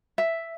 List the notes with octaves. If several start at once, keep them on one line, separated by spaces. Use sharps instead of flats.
E5